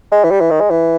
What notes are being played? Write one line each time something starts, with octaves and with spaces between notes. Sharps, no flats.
G#3
E3
G3
E3
D#3
G#3
E3